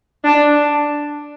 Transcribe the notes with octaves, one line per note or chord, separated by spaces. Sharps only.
D4